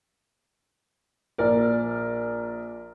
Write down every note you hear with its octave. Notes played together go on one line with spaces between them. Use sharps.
A#1 A#4 D5